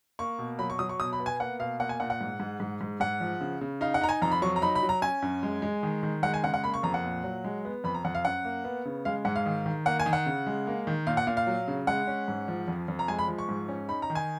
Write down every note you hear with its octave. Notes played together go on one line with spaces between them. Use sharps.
A#3 C#6
B2
F#3 B5
C#6
F#3 D#6
C#6
B2 D#6
B5
B3
G#5
A#3 F#5
B2 F5
A#3 F#5
G#5
A#2 F#5
F#5
G#2
G#2
G#2
G#2
G#2 F#5
F3
C#3
C#3
D#4 F5
F#5
D#4 A#5
G#5
F2 A#5
B5
F#3 C#6
A#5
D#4 B5
B5
F#3
A#5
C#4 G#5
F#2
G#3
G#3
D#3
D#3
G#3 F#5
G#5
C#3 F#5
F#5
A#3 B5
C#6
F2 A#5
F#5
A#2
F#3
G#3
B3
F2 B5
A#5
F2 F#5
F5
F#2 F#5
A#3
B3
C#3
G#3 F5
G#2 F#5
F5
D#3
D#3
A#3 F#5
G#5
D#3
F#5
C#3
G#3
A#3
D#3
A#2 F5
F#5
A#2 F5
F5
F#3
C#3
G#3 F#5
C#4
G#2
F3
F2
F2
A#5
G#3 G#5
B5
F3
C#6
G#2
C#4
D#4 B5
A#5
D#3
G#5